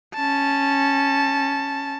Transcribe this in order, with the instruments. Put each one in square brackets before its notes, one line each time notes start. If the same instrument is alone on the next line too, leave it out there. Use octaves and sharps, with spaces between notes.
[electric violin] C#4 A5